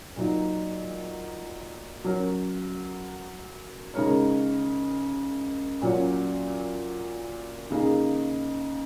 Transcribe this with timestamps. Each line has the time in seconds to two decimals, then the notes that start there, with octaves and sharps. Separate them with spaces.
0.16 A#2 F#3 D#4
2.04 F#3 C#4 A#4 C#5
3.94 C#3 G#3 D#4 A#4 C#5
5.82 A#2 F#3 C#4 F#4 C#5
7.70 C#3 A#3 D#4 G#4